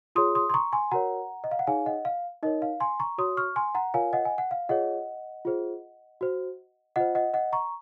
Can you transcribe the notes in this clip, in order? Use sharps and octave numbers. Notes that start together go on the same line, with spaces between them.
F4 G#4 C#5 C6 D#6
C6 D#6
C6
A#5 C#6
G#5 C6
F#4 A#4 C#5 F#5 A#5
D#5
F5
F#5
D#4 G#4 C#5 F5 G#5
D#5 F#5
F5
D#4 A#4 C#5 D#5
F5
G#5 C6
A#5 C#6
F#4 C#5 C6 D#6
C#6 F6
G#5 C6
F#5 A#5
F4 A#4 C#5 F5 G#5
D#5 F#5
G#5
F#5
F5
F4 G#4 C#5 D#5 F#5
F4 G#4 C5
F#4 C5
F4 C5 D#5 F#5
D#5 F#5
D#5 F#5
A#5 C#6